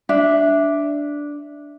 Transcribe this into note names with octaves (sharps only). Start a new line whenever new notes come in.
D4 E5